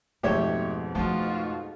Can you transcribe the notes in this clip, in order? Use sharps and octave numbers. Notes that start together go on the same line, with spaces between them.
F2 G#2 B2 A3 B3 G4 C#5 E5
F3 A3 D#4 F4 F#4